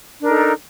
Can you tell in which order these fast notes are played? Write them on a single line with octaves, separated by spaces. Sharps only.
D4 A#4 D#4 A4